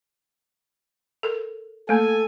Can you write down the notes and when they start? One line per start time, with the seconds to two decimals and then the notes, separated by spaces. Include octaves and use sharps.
1.23 A4 A#4
1.89 A3 A#3 A4 G#5